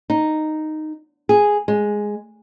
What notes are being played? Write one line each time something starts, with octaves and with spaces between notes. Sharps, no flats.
D#4
G#4
G#3